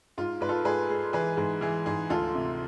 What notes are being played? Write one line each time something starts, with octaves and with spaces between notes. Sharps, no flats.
G#2 F4
G#2 B4
F4 A4
G#2 G#4 B4
G#3
E3 G#4 B4
G#2
E3 G#4
G#2 G#4
D2 F4 A4
C3